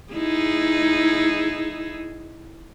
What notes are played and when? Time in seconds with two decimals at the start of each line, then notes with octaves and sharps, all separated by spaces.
0.13 D#4 E4 G#4